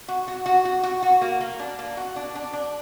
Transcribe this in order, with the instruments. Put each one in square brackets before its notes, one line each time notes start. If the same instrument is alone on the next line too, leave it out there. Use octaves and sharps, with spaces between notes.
[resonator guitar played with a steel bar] F#4
F#4
F#4
F#4
F#4
F#4
A#3
A#3
D4
A#3
F#4
D4
D4
D4